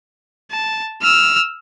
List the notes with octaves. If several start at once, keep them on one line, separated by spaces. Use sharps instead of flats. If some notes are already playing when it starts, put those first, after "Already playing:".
A5
E6 F6